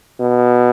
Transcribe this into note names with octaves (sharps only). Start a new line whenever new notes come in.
B2